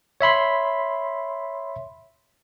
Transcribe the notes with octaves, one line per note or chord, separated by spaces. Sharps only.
C#5 E5 B5 C6